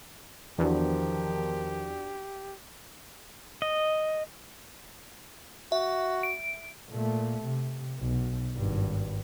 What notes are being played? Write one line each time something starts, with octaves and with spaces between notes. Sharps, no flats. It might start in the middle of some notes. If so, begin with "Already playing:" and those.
E2 D#3 F3 D4 F#4 G4
D#5
F#4 E5
D7
A#2 A3
C3
B1
G#1 G2